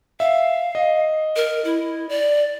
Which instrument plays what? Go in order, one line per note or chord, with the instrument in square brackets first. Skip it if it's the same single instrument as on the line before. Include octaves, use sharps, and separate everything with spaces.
[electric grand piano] E5 [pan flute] F5
[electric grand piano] D#5
[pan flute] A#4
E4
D5